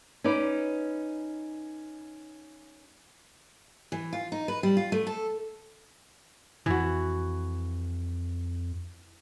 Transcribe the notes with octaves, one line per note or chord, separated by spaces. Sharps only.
C#4 D#4 B4 D5
E3
F4
D#4
B4
G3
F4
A3
A4
F2 E3 F#4